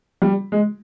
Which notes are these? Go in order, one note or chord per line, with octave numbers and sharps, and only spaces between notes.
G3
G#3